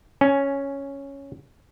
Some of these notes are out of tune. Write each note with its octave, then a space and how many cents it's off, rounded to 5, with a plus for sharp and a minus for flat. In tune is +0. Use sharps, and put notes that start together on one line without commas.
C#4 +0 G#5 +15